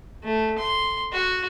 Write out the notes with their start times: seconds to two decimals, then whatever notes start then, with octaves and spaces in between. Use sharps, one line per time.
0.24 A3
0.58 C6
1.12 F#4